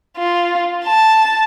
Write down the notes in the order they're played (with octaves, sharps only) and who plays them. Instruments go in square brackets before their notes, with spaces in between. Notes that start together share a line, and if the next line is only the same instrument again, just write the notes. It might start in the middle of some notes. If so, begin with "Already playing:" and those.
[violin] F4
A5